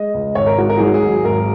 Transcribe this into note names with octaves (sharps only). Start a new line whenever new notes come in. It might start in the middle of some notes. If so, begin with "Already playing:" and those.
Already playing: G#3 D#5
C#2
G#1 C#5
A#4
G#2 F#4
A#4
F#3 G#4
F#4
G#4
G#1
G#1 A#4